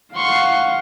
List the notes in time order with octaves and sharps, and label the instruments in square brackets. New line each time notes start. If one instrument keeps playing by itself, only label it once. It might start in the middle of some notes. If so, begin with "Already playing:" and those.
[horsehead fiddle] F5 F#5 [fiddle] C6 C#6